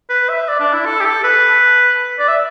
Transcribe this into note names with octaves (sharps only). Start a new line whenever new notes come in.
B4
E5
D5
D4
E4
A4
G4
A4
B4
D5
E5